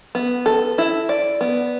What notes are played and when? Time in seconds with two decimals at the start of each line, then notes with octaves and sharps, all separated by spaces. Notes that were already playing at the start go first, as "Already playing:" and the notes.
0.15 B3
0.46 A4
0.78 E4
1.09 D5
1.41 B3